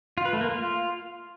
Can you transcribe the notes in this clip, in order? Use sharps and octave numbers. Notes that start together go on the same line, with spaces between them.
F4
B4
A3
A#3
F4